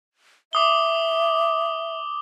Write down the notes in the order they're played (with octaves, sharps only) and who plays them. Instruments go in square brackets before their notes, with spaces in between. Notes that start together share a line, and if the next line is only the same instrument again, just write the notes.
[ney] E5 [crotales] D6 D#6 G7